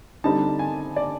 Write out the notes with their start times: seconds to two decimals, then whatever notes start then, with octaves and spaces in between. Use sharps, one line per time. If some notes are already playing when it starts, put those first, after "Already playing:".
0.24 D3 G3 C4 D#4 A5
0.59 G#5
0.96 D5